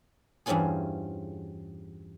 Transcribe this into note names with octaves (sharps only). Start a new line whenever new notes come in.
E2 G2 C4 C#4 F4 G#4